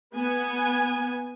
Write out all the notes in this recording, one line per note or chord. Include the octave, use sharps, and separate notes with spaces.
B3 G#5